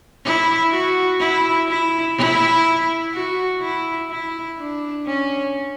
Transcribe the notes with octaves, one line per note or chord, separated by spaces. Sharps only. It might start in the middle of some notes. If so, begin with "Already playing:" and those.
E4
F#4
E4
E4
E4
F#4
E4
E4
D4
C#4